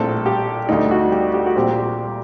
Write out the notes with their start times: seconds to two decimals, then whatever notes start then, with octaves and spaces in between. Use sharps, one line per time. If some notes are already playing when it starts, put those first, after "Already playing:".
Already playing: A#1 A2 A3 C4 A4
0.26 G4
0.69 D2 D3 A3 D#4
0.91 F#4
1.12 G4
1.34 G4
1.46 F#4
1.55 A#1 A#2 G3 C4 G4